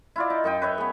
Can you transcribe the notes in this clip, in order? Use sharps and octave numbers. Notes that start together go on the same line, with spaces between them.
E4 F4 D5
D#4
F#2 D#4 G5
B4 C#5 E5
B3 G#4